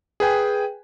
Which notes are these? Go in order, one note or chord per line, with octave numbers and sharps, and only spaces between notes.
G#4 B4 G5 G#5